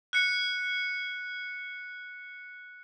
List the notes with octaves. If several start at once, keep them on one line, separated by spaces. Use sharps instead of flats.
F#6 C#7